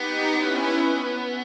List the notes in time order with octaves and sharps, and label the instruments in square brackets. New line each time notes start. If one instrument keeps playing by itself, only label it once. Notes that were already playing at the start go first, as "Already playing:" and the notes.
Already playing: [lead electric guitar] B3 [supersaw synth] D#4 G4
[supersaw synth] C#4 E4